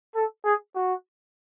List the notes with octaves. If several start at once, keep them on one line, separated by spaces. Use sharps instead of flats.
A4
G#4
F#4